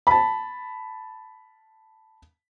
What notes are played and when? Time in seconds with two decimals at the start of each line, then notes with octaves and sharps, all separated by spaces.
0.07 A5 B5